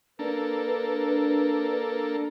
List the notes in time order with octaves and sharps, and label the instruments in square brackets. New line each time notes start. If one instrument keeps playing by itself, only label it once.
[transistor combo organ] A#3 A4 [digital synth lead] D4 [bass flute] B4